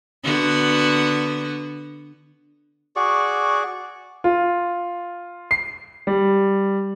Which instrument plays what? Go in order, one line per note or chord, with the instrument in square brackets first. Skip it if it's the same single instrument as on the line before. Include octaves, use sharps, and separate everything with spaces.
[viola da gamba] D3 B3 F#4
[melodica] F#4 G#4 D5 C#6
[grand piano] F4
C7
G3